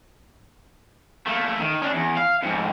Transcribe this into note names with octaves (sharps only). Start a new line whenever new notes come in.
A3 A#3
D#3
C#4 D4
E2
F5
F2 G#2